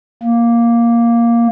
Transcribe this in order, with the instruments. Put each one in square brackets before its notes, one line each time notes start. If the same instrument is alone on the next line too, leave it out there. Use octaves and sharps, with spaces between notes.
[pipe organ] A#3